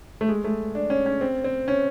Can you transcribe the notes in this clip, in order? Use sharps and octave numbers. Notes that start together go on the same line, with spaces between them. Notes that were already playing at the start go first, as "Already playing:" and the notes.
A3
G#3
A3
D4
C#4
C#4
C4
C4
C#4